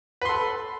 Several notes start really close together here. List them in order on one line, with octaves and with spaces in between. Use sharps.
B4 C6 A4